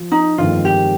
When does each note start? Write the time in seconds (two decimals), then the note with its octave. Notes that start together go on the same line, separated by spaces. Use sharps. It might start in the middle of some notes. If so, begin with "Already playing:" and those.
Already playing: F3
0.12 D#4
0.38 G1 F2 D#3 G#3 F4
0.65 G4